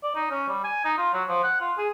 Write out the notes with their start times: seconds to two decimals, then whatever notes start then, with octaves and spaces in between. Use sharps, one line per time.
0.03 D5
0.15 D#4
0.30 C#4
0.48 G3
0.64 G#5
0.85 D#4
0.98 F4
1.13 F#3
1.28 F3
1.43 F#5
1.60 F4
1.78 G#4